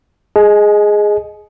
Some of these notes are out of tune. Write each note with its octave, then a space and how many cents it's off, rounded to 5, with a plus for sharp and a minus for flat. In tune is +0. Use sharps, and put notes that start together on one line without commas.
G#4 +0 D#5 +0 G#5 +35